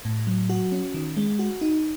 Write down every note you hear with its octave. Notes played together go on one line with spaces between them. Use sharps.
A2
F#3
F#4
C#4
D#3
G#3
F#4
D#4